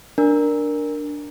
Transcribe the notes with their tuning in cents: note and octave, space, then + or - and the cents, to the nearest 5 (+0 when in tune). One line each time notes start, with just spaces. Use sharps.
D4 +0 A#4 +0